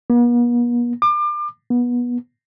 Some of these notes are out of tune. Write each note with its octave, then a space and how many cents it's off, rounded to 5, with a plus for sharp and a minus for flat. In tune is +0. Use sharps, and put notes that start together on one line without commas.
B3 -45
D6 +35
B3 -20